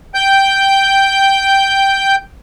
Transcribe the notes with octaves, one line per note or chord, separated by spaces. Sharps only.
G5 G6